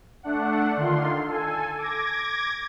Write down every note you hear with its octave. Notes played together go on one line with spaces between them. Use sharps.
A3 D4 F#5
D3 D#3 F4 C6
A4 G#5
D6 G#6 A#6